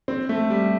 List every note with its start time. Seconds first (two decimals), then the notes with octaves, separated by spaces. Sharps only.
0.08 C4
0.29 A3
0.50 G3